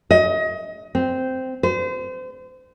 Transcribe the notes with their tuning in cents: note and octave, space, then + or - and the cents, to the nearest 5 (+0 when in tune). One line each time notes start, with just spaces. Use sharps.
D#5 +25
C4 -10
C5 -35